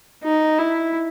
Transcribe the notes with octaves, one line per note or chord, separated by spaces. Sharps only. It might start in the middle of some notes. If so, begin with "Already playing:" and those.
D#4
E4